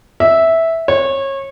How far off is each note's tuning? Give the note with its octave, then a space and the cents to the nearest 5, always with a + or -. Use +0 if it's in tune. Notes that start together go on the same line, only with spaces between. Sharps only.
E5 -10
C#5 -25